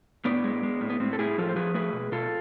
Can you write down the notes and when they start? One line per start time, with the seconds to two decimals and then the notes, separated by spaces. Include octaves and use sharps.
0.25 A2 B3 D4
0.44 G#3
0.63 G#3
0.81 A2
0.89 B3
1.00 A2 C4
1.13 A4
1.19 A2 E4 G#4
1.38 F3 F4 A4
1.49 C5
1.56 F3 G#4 B4
1.74 A3 G#4 B4
1.93 B2
2.12 B2 F4 A4